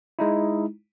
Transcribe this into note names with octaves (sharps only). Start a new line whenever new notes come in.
G#3 D#4 E4